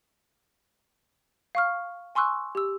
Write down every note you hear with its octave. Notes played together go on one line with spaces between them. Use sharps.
F5 C#6 F6
G#5 C6 C#6 E6 F#6
G4 E6